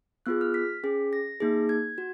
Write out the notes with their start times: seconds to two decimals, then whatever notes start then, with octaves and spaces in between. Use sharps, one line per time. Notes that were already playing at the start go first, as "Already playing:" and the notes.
0.26 B3 F4 G#4 F#6
0.41 F6
0.54 B6
0.84 C#4 G#4
1.13 A#6
1.40 A#3 D#4 G#4
1.69 G#6
1.98 F#4